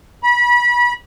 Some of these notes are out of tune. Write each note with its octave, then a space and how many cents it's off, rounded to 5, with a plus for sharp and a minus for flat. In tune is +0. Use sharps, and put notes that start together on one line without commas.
B5 -30